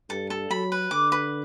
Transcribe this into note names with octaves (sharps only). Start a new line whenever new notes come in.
G2 A4
A4
F#3 B5
B4
D3 D6
B4